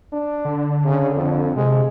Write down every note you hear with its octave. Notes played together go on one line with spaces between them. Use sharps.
D4
D3
C#3
F2
C3 G#3